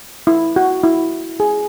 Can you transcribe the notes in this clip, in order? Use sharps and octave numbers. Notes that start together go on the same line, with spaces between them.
E4
F#4
E4
G#4